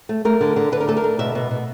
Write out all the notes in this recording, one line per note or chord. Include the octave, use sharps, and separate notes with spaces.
A3
A3 A#4
D3
D3
D3 B4
A#4
A3 A4
A#4
D3
B2 E5
B2
B2